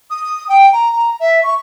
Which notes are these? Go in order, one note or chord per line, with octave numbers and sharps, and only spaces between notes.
D#6
G5
A#5
A#5
E5
C#6